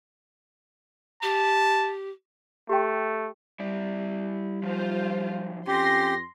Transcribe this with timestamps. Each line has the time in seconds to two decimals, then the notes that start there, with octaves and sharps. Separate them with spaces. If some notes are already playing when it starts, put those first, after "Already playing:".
1.22 G4 A5
2.69 A3 G4 G5
3.60 G3 E4 D5 E5
4.63 F3 F#3 D#4 F4 C5
5.68 F2 C#4 G4 C6 A#6